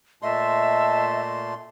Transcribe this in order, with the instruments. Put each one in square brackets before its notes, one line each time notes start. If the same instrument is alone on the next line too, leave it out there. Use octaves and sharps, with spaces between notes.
[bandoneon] A#2 A3 C6 [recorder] D#5 [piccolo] E5 [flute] A5